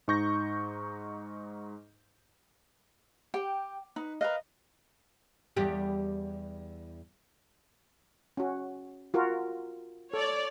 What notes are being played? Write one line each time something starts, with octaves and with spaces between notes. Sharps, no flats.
G#2 D#4 C#6 G6 A#6
G4 G5
D#4 B4
A#4 B4 D#5 F5
E2 G3 G4
C#4 F#4
F4 F#4 A#4
A4 C#5 D5